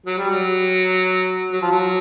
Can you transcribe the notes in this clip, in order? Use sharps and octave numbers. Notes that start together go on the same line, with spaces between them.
F#3
G3
F#3
F#3
F3
F#3